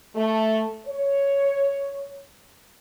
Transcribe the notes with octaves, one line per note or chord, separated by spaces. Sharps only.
A3
C#5